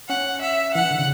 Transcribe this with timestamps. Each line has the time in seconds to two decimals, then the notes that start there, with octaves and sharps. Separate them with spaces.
0.09 C#4 F#5
0.42 E5
0.75 E3 F#5
0.91 D3
0.99 C#3